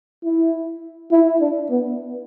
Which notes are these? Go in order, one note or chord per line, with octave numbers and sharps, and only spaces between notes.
E4
E4
D4
B3